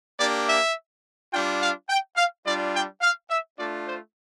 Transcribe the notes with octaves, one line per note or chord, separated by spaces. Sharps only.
A#3 D4 G4 D5
E5
G3 D4 F4 G5
F5
G5
F5
G3 D4 F4 D5
G5
F5
E5
A3 D4 F4 D5
C5